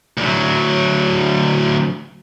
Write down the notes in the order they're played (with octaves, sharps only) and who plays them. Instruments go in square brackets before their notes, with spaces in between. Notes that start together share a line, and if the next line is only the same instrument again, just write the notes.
[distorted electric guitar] D2 F#3